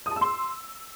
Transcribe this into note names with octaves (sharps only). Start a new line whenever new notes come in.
D#6
A5
E6
C6